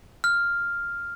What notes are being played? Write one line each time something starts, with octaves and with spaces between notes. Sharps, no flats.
F6